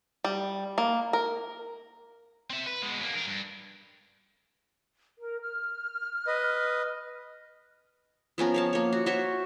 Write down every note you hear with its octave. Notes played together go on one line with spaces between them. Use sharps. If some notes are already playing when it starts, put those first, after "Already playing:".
G3
A#3
A#4
C4 E5
B4
B2 G#3
F#2 A#3
D4 A#4
G2
A#4
F6
B4 D#5
F3 B3 C#4 A#4
C#5 F5 A5
A#3 C#5
F#4
F#4 C5 C#5 E5